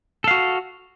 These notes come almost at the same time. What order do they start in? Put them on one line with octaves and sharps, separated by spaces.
A4 F5 F#4